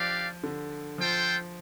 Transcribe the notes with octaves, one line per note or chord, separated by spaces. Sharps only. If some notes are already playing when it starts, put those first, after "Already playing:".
Already playing: F3 D4 G4 D5 F5
D3
F3 F4 A4 C5 G5